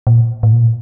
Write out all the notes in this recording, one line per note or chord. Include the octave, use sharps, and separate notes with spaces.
A#2
A2
A#2